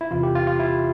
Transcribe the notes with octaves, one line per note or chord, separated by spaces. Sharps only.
E4
E2 C3 E3 F4
G4
F4
F4
E4